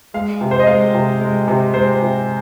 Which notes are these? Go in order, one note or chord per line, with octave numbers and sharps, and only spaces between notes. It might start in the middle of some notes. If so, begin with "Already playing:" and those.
G#3 F5
C3
C5
D#5
G#3 F5
C3
G#3
C3
G#3 C5
C3